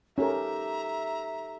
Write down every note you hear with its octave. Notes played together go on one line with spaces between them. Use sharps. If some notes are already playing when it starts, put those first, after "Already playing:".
C#4 D#4 G4 A4 A#4 E5 A#5